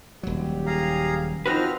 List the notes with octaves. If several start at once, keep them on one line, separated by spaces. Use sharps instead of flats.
D#1 F#3 G4
G#4 F5 A#5
F3 C4 D#4 F#4 B4 F6